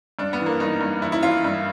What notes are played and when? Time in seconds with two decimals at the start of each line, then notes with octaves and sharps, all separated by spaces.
0.19 G2 D4
0.33 B3
0.40 E3
0.46 A#3
0.60 G2 D#4
0.81 G2
1.02 E3 E4
1.12 E4
1.23 E3 F4
1.44 G2